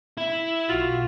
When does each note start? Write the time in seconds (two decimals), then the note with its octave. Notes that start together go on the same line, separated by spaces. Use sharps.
0.18 E4
0.69 B1 F4 F#4